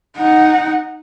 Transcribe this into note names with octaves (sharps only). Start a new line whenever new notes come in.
D#4 F#5